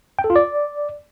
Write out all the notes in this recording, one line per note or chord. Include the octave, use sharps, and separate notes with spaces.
G5
A4
F4
D5